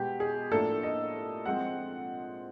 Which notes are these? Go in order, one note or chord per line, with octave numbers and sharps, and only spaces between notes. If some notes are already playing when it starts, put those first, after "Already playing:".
Already playing: B2 G#3 B3 G4
G#4
A2 F3 A#3 D4 A4
D#5
F3 G#3 C4 F#5